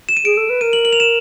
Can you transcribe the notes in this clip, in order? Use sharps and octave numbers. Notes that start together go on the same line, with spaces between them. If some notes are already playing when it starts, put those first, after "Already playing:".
E7
D#7
G#4 D7
A4
B4
A#4 D#7
F#7
F#7
F7
E7